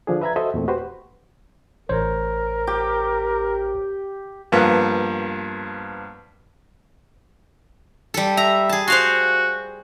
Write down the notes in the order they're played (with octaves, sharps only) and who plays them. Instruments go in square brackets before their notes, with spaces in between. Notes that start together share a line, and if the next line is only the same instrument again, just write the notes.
[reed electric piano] D3 F3 D4 G#4
B4 E5 A#5 B5 G#6
F#4 A4 C5 D#5 E5
E2 A#2 A3 C4
F#4 G4 B4 C5
[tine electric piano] A1 C5 C#5 [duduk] A#4
[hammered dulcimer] G4
[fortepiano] G2 F3 A#3 B3
[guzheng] G3 A4
[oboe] E5 [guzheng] A#5
[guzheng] G#4 A5
[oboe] F#4 [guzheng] C5 F5 C6